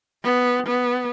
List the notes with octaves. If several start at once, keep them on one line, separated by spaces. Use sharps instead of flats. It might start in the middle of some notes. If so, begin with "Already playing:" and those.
B3
B3